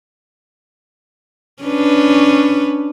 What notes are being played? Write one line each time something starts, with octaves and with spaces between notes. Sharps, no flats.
C#4 D4 B4